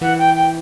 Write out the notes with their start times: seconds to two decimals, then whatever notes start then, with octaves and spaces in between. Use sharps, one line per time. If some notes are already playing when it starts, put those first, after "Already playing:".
0.01 E3 F#5
0.18 G5
0.35 G5